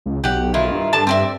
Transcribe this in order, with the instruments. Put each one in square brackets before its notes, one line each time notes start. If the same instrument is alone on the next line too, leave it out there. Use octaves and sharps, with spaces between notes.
[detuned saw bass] C#2
[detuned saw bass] B1 [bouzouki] G4 F#5
[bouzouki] D#3 E4 F4
[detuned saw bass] G2
[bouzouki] A2 D4 A5
C4 D5 E5